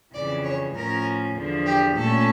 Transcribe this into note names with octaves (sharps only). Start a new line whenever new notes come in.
F2 C#3 E3 D5
C#5
A2 F3 C#4 A#4
E2 D3 F3
G4
A#2 A3 C#4 A4